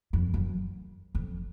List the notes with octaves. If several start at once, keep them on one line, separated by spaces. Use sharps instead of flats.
F2
F#2
F2